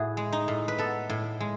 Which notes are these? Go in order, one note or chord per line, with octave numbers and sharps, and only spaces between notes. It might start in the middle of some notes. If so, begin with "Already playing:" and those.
Already playing: A2 E4 F#4 G#4
G#3
D#4
A2
B4
B3 A4
A2
G#3